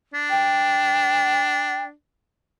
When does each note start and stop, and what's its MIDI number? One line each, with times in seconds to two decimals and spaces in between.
0.14 1.92 62
0.30 1.83 79